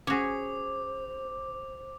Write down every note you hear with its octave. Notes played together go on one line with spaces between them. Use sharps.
C#4 F#4 G#4 C5 C#5 D6